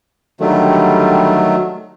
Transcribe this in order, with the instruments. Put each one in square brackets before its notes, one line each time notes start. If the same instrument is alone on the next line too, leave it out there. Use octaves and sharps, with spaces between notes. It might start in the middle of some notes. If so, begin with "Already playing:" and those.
[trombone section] D3 G3 [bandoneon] D#3 F#3 A3